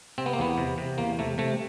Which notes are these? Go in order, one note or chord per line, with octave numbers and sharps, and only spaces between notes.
C3 C4
B3
A#3
E2 B3
C3
C3
E2 A#3
C3 A3
C3 A3